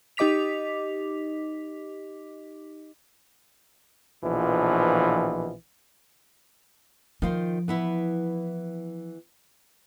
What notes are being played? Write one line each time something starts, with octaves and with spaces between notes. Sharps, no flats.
D#4 G4 D#5 D6 B6 F7
A#1 B2 E3 F3
D#3 F3 F4 C5
E3 B3 E4